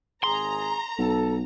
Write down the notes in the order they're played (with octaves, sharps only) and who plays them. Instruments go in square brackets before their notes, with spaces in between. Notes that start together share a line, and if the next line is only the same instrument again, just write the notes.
[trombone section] G#1 G#4 [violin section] A#5 [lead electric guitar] C6
[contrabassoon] B1 [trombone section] A4